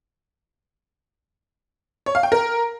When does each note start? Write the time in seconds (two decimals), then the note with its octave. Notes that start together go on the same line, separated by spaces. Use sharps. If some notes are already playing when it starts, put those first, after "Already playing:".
2.06 C#5
2.15 F5
2.23 G5
2.32 A#4